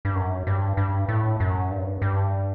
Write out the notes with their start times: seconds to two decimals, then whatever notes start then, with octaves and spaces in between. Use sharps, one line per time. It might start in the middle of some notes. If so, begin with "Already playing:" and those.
0.05 G2
0.15 F#2
0.47 G2
0.77 G2
1.09 A2
1.40 F#2
1.71 G2
1.79 F#2
1.86 G2
2.02 G2